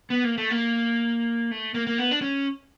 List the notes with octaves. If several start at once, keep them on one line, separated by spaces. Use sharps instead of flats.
B3
A#3
A3
A#3
A3
A#3
A#3
B3
D4
C#4